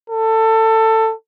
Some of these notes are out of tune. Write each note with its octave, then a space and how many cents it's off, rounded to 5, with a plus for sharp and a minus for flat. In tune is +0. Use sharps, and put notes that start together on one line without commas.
A4 +20